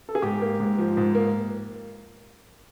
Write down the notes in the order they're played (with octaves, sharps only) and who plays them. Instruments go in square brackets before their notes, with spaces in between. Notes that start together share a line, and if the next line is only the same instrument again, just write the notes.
[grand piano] A4
G#4
G#2 G4
A#3
G#2
F3
G#2
A#3